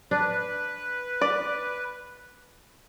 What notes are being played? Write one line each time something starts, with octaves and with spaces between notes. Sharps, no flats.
D4 B4
D5